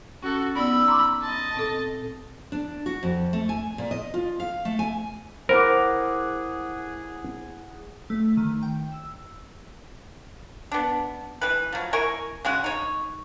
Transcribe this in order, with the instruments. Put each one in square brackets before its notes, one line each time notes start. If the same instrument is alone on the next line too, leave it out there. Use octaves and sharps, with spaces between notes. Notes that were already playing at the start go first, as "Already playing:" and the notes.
[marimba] C#4 [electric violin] F#4 A4
[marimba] B3 D#4 D5 [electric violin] B5 E6
[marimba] A#5 C6 D6
[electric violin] D#5 A5
[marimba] A#2 C4 A4
[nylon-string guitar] D4
F#4
F2
A3
G#5
A#2
D#5
F4
F5
A3
G#5
[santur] E4 F#5 D6 [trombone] G#4 [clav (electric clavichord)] A#4 [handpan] C5
[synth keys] A3
D#3
G5
E6
[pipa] B3 D4
E3 B4
F3 F#3
E4 A#4 G#5 C#6
C#3 G#3 F#4
D#4 C#5